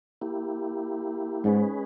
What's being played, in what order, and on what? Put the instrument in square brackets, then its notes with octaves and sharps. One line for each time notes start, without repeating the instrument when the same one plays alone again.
[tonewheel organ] A#3 E4 G4
[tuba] G#2 [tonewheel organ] G#3 C#4 G#4 B4